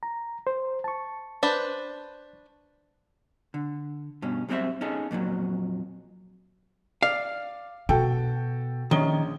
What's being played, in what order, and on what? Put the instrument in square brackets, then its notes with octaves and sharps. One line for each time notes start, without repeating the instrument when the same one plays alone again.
[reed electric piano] A#5
C5
A5 C#6
[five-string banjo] D4 B4 C5
[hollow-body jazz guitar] D3
G2 B2 C#4
F#2 G3 C4 G4 C5 E5
C#4 D#4 G#4 A4
F2 A#2 F3 F#3
[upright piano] D5 [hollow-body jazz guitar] F5
[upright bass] B2 [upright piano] F#4 A4 G5
[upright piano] A#1 C#4 G7 [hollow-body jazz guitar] D#3